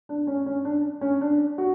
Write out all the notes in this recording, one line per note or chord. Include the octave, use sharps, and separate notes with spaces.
D4
C#4
C#4
D4
C#4
D4
F#4